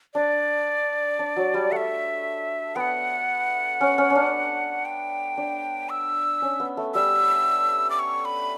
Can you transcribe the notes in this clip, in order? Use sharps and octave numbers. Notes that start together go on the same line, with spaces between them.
D4 D5
D4
F#3
G3
A3 E5 F#5
B3 F#5 G5
C#4
C#4
C#4
D4
G5
D4
E6
C#4
B3
A3
G3 E6
D6
C#6
B5